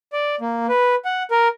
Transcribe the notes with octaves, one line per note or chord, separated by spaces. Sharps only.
D5
A#3
B4
F#5
A#4